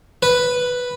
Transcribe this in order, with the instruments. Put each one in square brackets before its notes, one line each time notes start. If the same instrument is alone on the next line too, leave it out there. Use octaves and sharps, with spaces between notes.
[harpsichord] B4